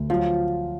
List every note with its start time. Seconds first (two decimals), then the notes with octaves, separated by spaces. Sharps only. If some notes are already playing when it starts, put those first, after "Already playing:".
Already playing: D2
0.10 F3 F#3